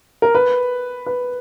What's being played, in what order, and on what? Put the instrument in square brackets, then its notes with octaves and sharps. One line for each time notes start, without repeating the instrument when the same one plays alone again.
[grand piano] A#4
B4
B4